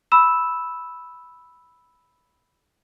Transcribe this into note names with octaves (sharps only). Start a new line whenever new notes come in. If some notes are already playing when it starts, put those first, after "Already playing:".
B5 E6 E7